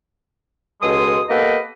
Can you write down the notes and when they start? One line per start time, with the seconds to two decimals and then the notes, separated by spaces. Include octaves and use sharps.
0.82 C#2 B2 G#3 A4 C6 D#6
1.29 A#3 B3 G4 A4 B4 D#5